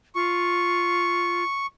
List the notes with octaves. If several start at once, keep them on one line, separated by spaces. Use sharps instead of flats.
F4 C#6